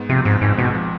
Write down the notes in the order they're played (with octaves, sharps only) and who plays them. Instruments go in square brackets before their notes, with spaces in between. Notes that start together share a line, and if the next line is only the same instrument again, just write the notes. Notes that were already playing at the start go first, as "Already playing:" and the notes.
Already playing: [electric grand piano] G#2 B3
[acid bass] C3 [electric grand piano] F3
[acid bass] G#2 [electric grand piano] C4
[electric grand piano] G#1 [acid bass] G#2
[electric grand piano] G#2 [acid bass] B2
[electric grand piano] F3